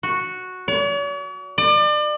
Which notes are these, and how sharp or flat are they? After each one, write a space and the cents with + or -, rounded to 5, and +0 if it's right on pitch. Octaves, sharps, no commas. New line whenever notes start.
F#4 -5
C#5 +45
D5 +35